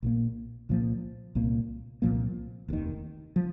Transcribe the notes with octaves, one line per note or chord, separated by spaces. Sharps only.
A#1 A#2 A#3
C2 A#2 F3 A#3
C2 A#2 A#3
C2 A#2 F3 A#3
F1 D#2 D#3
F3